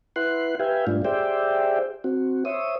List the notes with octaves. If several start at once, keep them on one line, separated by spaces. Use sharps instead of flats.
E4 B4 F#5 C6 F#6
G4 B4 E5 F5 G5 G#5
G#2 G3 A3 D4 F4
G4 G#4 C5 D5 E5 G5
C4 F#4
C5 C#5 E5 D#6